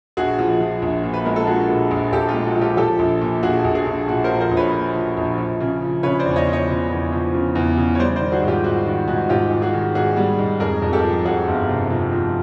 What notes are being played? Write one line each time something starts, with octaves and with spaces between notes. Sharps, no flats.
A#1 F#4 G#4
F3
F3
A#1
A#2
B4
G#3 A#4
A4
F3 F#4 G#4
A#2
A#1
A#1 G4 A4
F4
G#3
F#4
F3
F4 G4
F3 G4 A4
A#1
A#2
A#1 F#4 G#4
A#1
F#4 G#4
A#1
A#2 F#4
A#4 C5
F3
A#4 C5
A#1
B4 C#5
A#2
F3
A#1
F3
C#3
F3
C#3 B4 C#5
C5 D5
E2
C#5 D#5
F3
C#5 D#5
C#3
E2
F3
C#3
E2
C#3
C#5
G3 C5 D5
C5 D5
D#3
F#4 G#4
G#2
F4 G4
G#2 F#4
D#3 F#4
G#2 F#4
G#2 F4 G4
G#2
F#4 G#4
D#3
G#2 F#4 G#4
G3
G#2
F2 G#4 A#4
F2
G4 A4
F3
F2 F#4 G#4
G1
C3
F3
F3